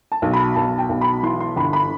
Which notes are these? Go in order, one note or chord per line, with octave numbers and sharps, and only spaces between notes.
A5
B1
B5
B1 A5
G5
B1
B5
E3 C6
C6
G1 B5
B5